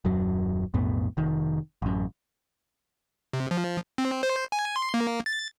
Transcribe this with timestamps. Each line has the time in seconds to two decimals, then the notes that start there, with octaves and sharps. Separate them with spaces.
0.05 D#1 F#2 F#3
0.74 B1 F2 A2 B3
1.17 F1 D#3
1.82 A1 F#2
3.33 C3
3.51 F3
3.98 C4
4.23 C5
4.52 G#5
4.76 C6
4.94 A#3
5.26 A6